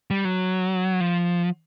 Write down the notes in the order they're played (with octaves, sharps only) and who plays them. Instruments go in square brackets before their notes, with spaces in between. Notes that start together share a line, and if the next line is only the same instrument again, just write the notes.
[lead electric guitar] G3
F#3
F3